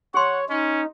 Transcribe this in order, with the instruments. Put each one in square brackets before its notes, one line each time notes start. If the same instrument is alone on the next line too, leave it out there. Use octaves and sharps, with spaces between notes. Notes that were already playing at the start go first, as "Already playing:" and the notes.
[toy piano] G4 C6 [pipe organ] C#5 [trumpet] F#5
[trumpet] C#4 [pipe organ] D#4